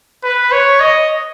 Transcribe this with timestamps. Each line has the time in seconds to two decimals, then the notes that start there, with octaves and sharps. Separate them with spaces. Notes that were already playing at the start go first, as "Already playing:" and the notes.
0.24 B4
0.52 C#5
0.80 D#5